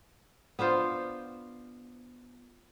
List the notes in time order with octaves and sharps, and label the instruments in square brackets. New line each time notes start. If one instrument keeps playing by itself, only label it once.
[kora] B3 D4 F4 C5